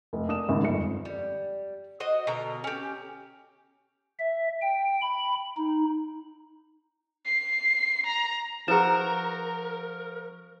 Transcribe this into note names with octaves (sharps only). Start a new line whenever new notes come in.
F1
A#3 D4 D#6 E7
G#1 E2 C#3
G1 F2 C#7
G3
F#4 C5 D#5
B2 D3 A#4 A#5
C#4 G4
E5
G5
B5
D#4
C7
A#5
F3 E4 F#4 G#4 A#4 B4 A#5 E7